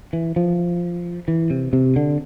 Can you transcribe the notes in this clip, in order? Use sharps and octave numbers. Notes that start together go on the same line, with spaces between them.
E3
F3
E3
C3
C3
D3